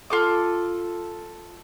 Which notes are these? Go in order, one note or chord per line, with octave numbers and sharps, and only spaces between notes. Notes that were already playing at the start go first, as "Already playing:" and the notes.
F4 A4 D6